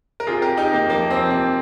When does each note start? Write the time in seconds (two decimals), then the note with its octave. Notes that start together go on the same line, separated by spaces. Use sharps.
0.20 A#4
0.27 C3 F4 G#4
0.42 G4 A#4
0.48 C3
0.57 D#4 G4
0.69 C3 A#3
0.90 F3 A#3
1.10 F3 C4
1.30 C3 C4